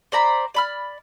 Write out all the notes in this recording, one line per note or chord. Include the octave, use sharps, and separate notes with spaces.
C5 D5 A#5 B5
D5 B5 F6